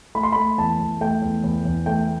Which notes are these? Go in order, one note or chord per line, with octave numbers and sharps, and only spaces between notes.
A3 B5
C6
A3 B5
E2 A5
E2
A3 G5
E2
E2
E2
A3 G5